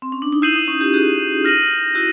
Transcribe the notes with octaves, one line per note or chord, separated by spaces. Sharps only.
C4
C#4
D4
D#4
E4 D#6 G6 C7 D#7 F#7
D#4
C#4
F4 G4
F#4 G#4
F6 A#6 D#7 F#7
E4 F#4